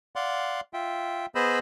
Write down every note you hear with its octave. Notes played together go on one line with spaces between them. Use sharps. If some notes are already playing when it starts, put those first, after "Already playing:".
D5 F5 F#5 C6
F4 E5 G5
B3 G#4 C5 D#5 B5 E6